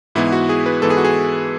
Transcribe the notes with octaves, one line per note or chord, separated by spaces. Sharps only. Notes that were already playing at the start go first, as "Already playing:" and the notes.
G#2 E3 B3 E4
F#4
G#4
B4
G#2 E3 B3 A4
G#4
F#4
G#4